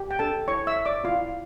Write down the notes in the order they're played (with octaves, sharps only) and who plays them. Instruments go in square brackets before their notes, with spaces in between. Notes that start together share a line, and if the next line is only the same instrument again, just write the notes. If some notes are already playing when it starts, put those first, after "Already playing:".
Already playing: [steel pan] G4
G5
D4 A4 A5
E4 C#5 C#6
E5 E6
C#5
D5 D6
E4 F4 F5